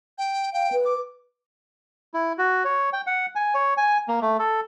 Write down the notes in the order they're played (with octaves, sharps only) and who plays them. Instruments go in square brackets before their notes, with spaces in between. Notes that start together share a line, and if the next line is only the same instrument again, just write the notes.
[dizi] G5
[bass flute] F5 [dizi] G5
[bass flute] B4
[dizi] D6
[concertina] E4
F#4
C#5
G5
F#5
G#5
C#5
G#5
A#3
A3
A4